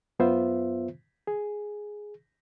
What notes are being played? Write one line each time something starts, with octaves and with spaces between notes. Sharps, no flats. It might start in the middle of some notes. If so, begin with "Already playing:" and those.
F#2 B3 F4 C5 E5
G#4